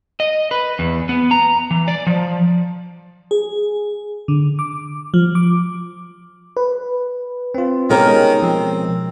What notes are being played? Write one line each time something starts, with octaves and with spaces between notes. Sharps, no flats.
D#5
B4
E2
B3
A#5
E3
D5
F3
G#4
D3
D6
F3
D6
B4
C4 F4
B2 D#3 G#3 C#4 G4 A#4
F3 C4